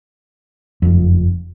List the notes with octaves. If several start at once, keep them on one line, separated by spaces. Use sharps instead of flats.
F#1 F2